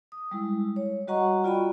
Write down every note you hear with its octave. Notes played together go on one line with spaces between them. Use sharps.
D#6
G3 G#3 E4
C#5
G3 F#4 D#5 F#5 A#5 C#6
F4 F#4 D5 D#5 G5 B5